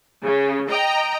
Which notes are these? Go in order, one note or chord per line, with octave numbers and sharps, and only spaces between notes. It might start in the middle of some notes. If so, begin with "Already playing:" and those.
C#3
D#5 G5 A#5